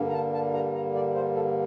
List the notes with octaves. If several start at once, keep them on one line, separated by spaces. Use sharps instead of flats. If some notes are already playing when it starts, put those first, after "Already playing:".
Already playing: G2 D3 G3 A#3
A#5
A5
A5
A#5
A#5
D5
C5
A4